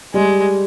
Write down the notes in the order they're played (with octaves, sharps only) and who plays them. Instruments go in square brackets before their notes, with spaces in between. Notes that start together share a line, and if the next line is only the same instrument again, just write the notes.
[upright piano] G3 [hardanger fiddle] G#3